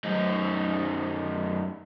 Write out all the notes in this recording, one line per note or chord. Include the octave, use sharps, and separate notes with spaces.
F#2 D#4